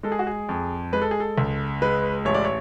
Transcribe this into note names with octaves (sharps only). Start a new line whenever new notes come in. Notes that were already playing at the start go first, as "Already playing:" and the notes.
G#3 A4
G#4
F#4
G#4
F2
G#3 B4
A4
G#4
A4
C#2
G#3 B4
A1 C#5
D5
C#5